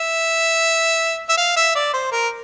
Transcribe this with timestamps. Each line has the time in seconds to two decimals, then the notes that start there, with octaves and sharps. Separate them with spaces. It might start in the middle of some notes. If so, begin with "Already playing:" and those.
Already playing: E5
1.29 E5
1.37 F5
1.56 E5
1.75 D5
1.93 C5
2.12 A#4